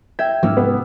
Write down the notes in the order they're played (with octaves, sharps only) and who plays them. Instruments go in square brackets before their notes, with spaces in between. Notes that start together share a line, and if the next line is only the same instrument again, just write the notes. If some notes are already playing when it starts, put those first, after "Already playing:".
[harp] E5 G5 G#6
[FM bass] G#2 [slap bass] F3 A#3 C#4 [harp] D6 E6 F6
[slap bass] F1 [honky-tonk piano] B3